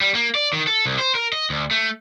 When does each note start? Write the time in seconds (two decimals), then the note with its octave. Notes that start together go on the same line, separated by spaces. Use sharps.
0.01 G3
0.15 A#3
0.35 D5
0.53 D#3
0.67 A4
0.86 C2
0.99 C5
1.15 A#4
1.33 D#5
1.50 D2
1.71 A3